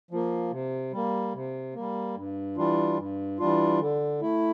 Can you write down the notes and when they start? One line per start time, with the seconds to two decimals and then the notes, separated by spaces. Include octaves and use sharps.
0.11 F3 A#3
0.51 C3
0.92 G3 A#3
1.33 C3
1.74 G3 A#3
2.15 G2
2.56 E3 G3 D4 F4
2.97 G2
3.39 E3 G3 D4 F4
3.80 D3
4.21 A3 E4